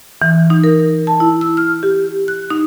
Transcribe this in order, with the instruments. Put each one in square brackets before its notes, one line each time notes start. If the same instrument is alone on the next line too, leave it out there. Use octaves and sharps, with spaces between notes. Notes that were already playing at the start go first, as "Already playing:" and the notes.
[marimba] E3
D#4
A#4
A5
E4
E6
F6
G4
F#6
D#4